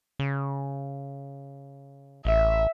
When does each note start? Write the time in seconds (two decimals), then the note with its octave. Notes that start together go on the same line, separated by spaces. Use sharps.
0.19 C#3
2.25 A1 E5